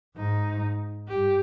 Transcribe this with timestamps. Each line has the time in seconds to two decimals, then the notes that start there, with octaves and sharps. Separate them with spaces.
0.16 G#2 D#4
1.08 G2 G4